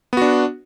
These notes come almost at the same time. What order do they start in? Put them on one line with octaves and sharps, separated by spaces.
B3 F#4 D4